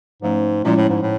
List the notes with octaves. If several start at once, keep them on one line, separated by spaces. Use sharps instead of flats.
G#2 F3 A3 C#4
A#2 F3 G#3 C#4 E4
A2
G#2
A2